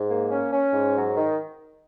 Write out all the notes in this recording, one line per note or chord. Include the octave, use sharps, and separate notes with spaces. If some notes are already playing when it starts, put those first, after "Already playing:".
Already playing: G#2
A#3
C#4
C#4
G#2
F#3
D#3